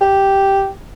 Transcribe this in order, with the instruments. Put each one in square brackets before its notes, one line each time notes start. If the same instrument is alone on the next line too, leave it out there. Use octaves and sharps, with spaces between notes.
[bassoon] G4